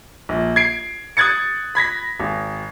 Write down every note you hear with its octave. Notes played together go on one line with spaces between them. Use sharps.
A#1
G#6 C7 D7
D#6 F#6 G#6 A6 C#7
B5 G#6 A#6 B6
G#1